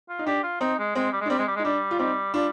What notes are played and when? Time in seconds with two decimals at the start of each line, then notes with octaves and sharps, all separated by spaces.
0.09 F4
0.19 D#4
0.27 D4 G4
0.43 F4
0.60 C4 D#4
0.79 G#3
0.95 G#3 C4
1.12 G3
1.21 G#3
1.26 D4
1.30 G3 C4
1.38 G#3
1.47 G3
1.56 G#3
1.59 D#4
1.65 G3 D4
1.91 F4
1.99 G3 C4 D#4
2.34 G3 D4 F4